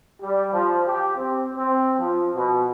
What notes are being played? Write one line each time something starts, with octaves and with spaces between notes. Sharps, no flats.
G3
F3
G4
C4
C4
F3
B2